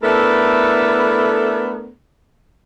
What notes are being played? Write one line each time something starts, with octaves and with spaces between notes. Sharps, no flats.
A3 B3 D4 E4 A4 A#4